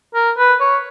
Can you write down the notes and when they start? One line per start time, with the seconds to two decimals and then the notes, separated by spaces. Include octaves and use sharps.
0.14 A#4
0.38 B4
0.60 C#5